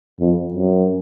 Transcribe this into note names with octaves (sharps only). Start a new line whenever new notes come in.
F2
F#2